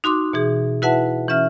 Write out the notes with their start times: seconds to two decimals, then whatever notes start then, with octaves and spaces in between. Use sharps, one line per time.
0.04 D#4 F#4 C6 D6 F#6
0.33 B2 E3 G#4
0.82 E4 F#4 B4 E5 F#5 A5
1.28 E3 C#4 E5 F6